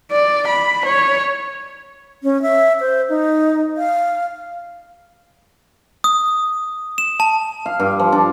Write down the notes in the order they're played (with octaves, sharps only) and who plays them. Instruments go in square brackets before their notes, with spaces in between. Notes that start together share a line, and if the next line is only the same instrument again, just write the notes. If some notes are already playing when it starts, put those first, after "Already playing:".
[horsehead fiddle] D5
B5
C#5
[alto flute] C#4
E5
C5
D#4
F5
[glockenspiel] D#6
E7
A5
[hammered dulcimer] F5
G2
F3
D4